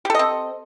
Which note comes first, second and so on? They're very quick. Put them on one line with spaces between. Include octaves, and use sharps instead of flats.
G4 A4 D#5 C4